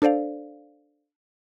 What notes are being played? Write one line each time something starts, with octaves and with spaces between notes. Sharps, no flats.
D4 A4 C5 D5 F5